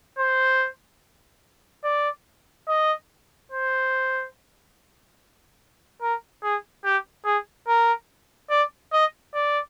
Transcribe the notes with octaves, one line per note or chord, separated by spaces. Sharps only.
C5
D5
D#5
C5
A#4
G#4
G4
G#4
A#4
D5
D#5
D5